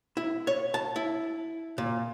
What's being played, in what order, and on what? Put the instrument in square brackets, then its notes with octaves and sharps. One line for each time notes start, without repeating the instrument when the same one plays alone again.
[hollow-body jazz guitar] E4
C#5
A5
E4
A#2